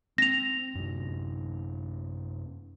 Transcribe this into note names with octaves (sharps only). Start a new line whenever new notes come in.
C4 A#6 F7
F#2 C3